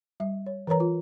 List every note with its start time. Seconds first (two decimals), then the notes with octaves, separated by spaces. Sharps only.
0.20 G3 E5
0.46 C#5
0.67 E3 A#4 B4 C#5 A#5
0.80 F4